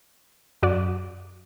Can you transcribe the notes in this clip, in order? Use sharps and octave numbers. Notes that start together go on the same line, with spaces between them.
F#2 F#4 D5